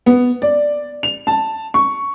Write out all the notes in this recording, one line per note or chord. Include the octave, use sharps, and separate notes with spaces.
B3
D5
F7
A5
C#6